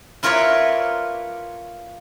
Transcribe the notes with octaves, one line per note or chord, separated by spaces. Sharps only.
E4 F4 A#4 B4 C#5 D5